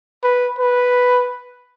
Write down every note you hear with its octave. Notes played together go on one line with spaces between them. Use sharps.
B4
B4